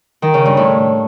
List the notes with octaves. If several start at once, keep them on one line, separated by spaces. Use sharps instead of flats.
D#3
C#3
G2
A2